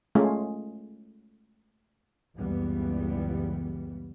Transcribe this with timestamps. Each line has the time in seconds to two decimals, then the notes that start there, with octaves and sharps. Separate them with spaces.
0.15 G#3 A3 C#4 F4
2.37 F#1 C#2 E3 G3 B3